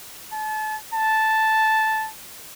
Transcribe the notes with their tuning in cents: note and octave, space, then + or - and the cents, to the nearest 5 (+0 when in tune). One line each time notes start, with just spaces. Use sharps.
A5 -35
A5 -5